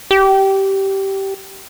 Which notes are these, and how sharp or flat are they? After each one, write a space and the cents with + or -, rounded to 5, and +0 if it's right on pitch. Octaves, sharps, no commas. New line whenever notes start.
G4 -15